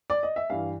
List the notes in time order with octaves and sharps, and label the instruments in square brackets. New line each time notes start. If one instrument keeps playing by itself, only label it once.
[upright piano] D5
D#5
E5
G2 E3 F5